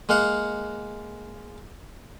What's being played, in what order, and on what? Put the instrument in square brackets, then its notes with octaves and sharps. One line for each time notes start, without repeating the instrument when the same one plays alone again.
[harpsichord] G#3 A#3 F5 F#5